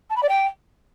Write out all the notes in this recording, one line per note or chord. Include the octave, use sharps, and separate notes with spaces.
A5
B5
D5
G5